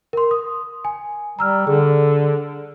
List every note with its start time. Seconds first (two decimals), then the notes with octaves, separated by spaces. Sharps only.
0.13 A#4 C6
0.31 D#6
0.85 G#5
1.39 G3 A#5 E6 F6
1.67 D3 G#4